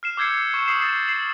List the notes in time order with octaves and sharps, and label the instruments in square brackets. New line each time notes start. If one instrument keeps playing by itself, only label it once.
[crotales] F6 C7 E7
D6 E6 G6 G#6 C7 C#7
C#6
D6 D#6 C7 E7
A6 C7
C7 E7 F#7